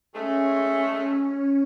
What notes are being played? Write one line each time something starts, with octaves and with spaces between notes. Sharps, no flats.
G#3 A3 C#4